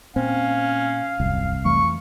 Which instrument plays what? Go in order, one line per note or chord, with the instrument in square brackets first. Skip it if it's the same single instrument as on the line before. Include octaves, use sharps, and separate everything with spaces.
[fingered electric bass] A#2 [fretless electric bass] C4 [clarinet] C#4 [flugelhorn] F5
[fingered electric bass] D#1 F#2 [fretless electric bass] C2
[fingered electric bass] F2 E3 A3 [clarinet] C#6